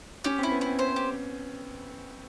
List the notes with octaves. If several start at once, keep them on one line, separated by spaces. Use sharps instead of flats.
C#4 G4
C4 E4
B3
C4 E4
C5
G4